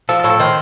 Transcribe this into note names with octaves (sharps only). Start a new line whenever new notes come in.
F3 A4
A4
A2
A4
D#3 C5